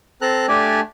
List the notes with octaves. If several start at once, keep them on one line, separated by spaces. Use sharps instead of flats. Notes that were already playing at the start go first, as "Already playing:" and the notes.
C4 A4 A#5 F#6
A3 D4 G4 D5 G#5